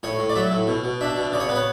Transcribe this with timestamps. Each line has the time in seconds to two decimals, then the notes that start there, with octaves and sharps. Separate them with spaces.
0.03 A2 C#5
0.19 A2
0.30 D5
0.36 F#3 E5
0.51 A2
0.67 B2
0.84 B2
1.01 D4 E5
1.16 B2
1.32 C#3 D5
1.40 C#5
1.49 B3 B4
1.56 C#5